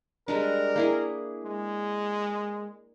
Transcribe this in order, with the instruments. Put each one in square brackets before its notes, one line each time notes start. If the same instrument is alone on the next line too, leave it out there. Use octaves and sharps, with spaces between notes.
[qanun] G3 G#3 D4 [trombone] A#4
[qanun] A#3 E4 G#4
[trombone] G#3